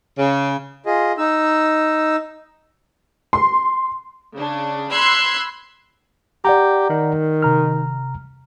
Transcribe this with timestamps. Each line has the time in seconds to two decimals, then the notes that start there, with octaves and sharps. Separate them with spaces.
0.18 C#3
0.86 F4 G#4 D#5
1.18 D#4 E6
3.33 C6
4.33 C#3 D4
4.91 B5 C6 E6 F#6 G#6 C7
6.45 G4 D5 F#5 A#5
6.90 D#3
7.43 C3 A#5 F6